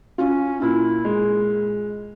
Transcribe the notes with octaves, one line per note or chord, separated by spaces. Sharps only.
C#4 F4
A#2 E4
G#3